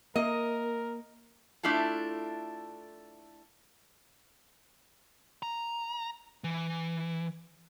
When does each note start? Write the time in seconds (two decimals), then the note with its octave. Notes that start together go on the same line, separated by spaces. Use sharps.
0.16 A#3 A#4 D#5
1.63 A3 D4 E4 F4 A4
5.43 A#5
6.44 E3